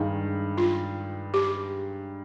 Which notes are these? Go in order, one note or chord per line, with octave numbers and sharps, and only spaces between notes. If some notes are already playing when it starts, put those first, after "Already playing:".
Already playing: G2 D#3 G#3
F4
G4